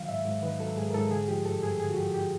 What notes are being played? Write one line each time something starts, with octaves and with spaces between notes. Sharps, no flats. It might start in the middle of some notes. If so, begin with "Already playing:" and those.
Already playing: D#3 F#3 F5
G#2 E5
G#2
D#3 B4
F#3 A4
G#2 G#4
A#4
G#2 A4
D3 G#4
F3 G4
G2 A4
G2 G#4
D3 G#4
F#4
F3 G4
G4